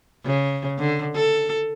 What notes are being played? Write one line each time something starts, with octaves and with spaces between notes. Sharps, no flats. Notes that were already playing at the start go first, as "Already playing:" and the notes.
C#3
D3
A4